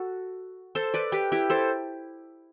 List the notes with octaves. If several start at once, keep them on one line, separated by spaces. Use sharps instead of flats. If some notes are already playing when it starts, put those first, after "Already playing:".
Already playing: F#4 A4
A4 C5
B4 D5
G4 B4
E4 G4
A4 C5